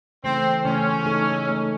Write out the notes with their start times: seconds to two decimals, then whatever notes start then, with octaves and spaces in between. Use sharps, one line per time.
0.24 C#3 E3 A3 C4
0.64 C#3 E3 A3 C#4
1.06 A3 D#4 A4
1.47 A3 D#4 A4